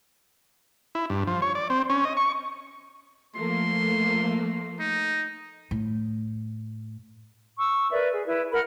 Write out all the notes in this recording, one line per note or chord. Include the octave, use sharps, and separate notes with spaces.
E4
G2
F3
C#5
D5
C4
C#4
D#5
C#6
F3 A3 A#3 C6
D#4
A2
C#6 E6
A#4 B4 D5 E5
G#4
E4 B4
A#4 F#5 B5 F6